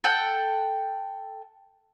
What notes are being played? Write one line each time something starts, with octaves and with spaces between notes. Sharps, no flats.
A4 F#5 G5